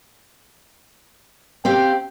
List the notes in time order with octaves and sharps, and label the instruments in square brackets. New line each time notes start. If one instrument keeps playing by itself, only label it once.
[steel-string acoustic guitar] C4 G4 F5 [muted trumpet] G5